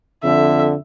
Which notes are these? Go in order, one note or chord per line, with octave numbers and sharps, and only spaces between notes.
F2 D3 E5